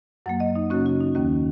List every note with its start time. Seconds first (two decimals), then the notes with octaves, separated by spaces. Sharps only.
0.26 F#2 F#3 A#3 F#5
0.40 D#5
0.56 D#4
0.70 F#2 C#3 A#3 C#4 F#4
0.86 F#4
1.00 D#4
1.15 D#2 D#3 A#3 C#4 F#4